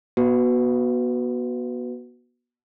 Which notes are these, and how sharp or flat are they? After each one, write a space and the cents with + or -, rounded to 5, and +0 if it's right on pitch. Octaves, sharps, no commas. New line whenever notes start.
B3 -30 F#4 +0 B4 +20